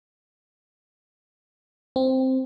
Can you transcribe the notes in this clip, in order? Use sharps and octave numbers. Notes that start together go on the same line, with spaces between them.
C4